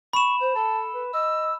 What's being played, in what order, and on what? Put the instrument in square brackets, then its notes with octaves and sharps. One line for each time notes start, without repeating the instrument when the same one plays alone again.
[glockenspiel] B5 E7 [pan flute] C#6
[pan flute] C5
[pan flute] A4 [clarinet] A5
[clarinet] B4
[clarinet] D#5 [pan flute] E6